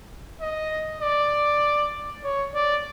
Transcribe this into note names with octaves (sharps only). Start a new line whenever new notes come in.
D#5
D5
C#5
D5